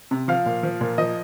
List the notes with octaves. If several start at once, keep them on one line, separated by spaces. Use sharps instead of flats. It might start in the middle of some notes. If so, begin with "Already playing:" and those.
C3
F3 F5
A#2
F3
A#2
F3 D#5